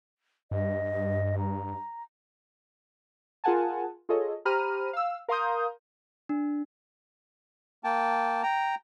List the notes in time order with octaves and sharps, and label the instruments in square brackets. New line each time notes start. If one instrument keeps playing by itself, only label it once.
[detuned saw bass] G2 [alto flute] D#5
[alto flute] A#5
[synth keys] F4 G#4 A#4 F#5 G#5 A5
F4 G#4 A4 C#5 D#5
G4 C5 A#5 B5 F6 D#7
F5 E6
A#4 F5 A#5 C6 D#6 G6
[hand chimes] D4
[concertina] A#3 G5 A5
G5 A#5